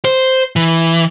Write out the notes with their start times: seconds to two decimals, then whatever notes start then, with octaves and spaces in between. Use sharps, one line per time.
0.05 C5
0.56 E3